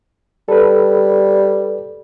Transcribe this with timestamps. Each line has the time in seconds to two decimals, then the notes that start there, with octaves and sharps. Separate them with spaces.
0.49 G3 A4 B4